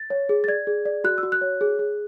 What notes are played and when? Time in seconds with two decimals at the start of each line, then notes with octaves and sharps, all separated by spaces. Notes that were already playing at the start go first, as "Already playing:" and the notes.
Already playing: A6
0.10 C#5
0.29 G#4
0.44 A6
0.48 D5 G#6
0.67 G#4
0.85 D5
1.04 F#4 F#6
1.18 E6
1.23 F#4
1.32 F#6
1.41 C#5
1.61 G#4
1.79 G#4